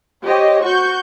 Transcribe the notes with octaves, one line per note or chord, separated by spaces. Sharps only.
G4 C5 C#5 D#5
F#4 C#6 G6